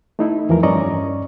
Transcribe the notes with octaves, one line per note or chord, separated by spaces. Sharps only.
A3 D#4 E4
E2 E3 F3 A#4
G2 C#4 D5 D#5 A#5 C#6